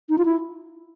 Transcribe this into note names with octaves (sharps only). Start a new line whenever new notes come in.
D#4
F4
E4